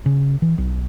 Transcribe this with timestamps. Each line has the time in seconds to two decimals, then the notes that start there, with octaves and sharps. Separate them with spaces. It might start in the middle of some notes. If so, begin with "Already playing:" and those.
0.06 C#3
0.42 E3
0.58 B1